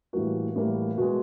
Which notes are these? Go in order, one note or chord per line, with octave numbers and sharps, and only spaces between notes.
A2 E3 G3 A#3 F#4
A2 E3 G3 A#3
B2 G#3 F#4